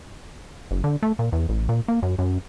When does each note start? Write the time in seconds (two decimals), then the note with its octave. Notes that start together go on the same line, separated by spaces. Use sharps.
0.71 F#1
0.84 D3
1.03 A3
1.19 A#2
1.33 E2
1.49 A1
1.69 A#2
1.88 A#3
2.03 F#2
2.19 F#2